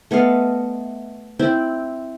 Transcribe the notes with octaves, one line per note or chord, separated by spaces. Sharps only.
A3 B3 D#5 F5
C4 E4 G5